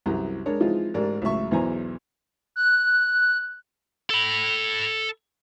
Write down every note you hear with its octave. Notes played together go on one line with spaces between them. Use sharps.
C2 F#2 E3 A#5
G#3 D4 A#4 C#5
E3 F3 G#3 C4 D#4 F4
A1 G#2 A#4 D5
C#2 A2 F#3 E5 C#6
B1 E2 E3 C5 G#5 A#5
F#6
A4 B5